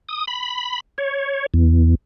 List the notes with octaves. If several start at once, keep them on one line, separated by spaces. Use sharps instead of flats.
D#6
B5
C#5
E2